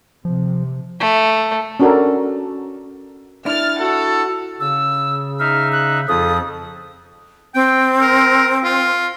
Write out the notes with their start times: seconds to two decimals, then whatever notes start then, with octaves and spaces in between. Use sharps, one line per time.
0.25 C3 F3
1.00 A3
1.80 C#4 D4 F#4 A4 A#4 D5
3.46 D4 E4 F6 A6
3.80 F#4 A4 F#5
4.60 C#3 E6
5.39 D#4 E5 F6
5.72 F#6
6.08 F2 F3 F4 G#4 A4 D#6
7.55 C4 G5
8.01 A#4
8.64 F4